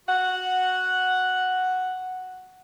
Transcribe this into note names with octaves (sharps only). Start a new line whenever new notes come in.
F#4 F#5